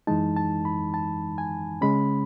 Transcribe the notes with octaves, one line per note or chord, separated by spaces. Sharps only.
F#2 E3 G#3 D#4 A5
A5
B5
A5
G#5
C#3 G#3 C#4 B5